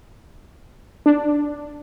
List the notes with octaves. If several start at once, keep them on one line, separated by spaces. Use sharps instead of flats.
D4